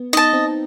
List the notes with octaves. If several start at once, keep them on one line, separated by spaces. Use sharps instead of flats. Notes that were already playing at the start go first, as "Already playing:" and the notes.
Already playing: B3
D#4 D#5 A5
C4